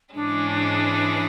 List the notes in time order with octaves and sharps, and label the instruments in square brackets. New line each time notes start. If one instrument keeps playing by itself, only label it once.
[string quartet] G#2 E3 G#3 C#4 [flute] D4